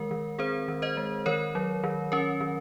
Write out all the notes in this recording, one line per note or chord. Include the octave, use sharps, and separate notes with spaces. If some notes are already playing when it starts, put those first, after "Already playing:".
Already playing: D#3 G#3 A#4
D#3
C4 G#4 C5
D#3
C5 D#5
G#3
D#3 A#4 C#5
F#3
D#3
C#4 A#4
D#3